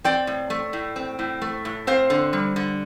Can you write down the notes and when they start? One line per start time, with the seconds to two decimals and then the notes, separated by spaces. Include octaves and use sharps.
0.04 C4 D5 G5
0.27 A2
0.50 A3
0.73 A2
0.96 C4
1.19 A2
1.41 A3
1.65 A2
1.87 C4 C5 F5
2.10 D3
2.33 G3
2.56 D3